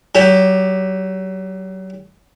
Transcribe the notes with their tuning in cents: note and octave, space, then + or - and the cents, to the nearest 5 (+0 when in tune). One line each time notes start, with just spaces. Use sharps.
F#3 +35 G4 +15